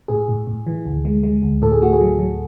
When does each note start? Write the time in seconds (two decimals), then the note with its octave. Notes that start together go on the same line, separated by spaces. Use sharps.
0.08 A2 G#4
0.28 A2
0.47 A2
0.67 E3
0.85 D2
1.05 G#3
1.23 G#3
1.42 D2
1.62 A2 A4
1.72 G#4
1.82 A3 F#4
1.93 G#4
2.01 F#3
2.19 F#3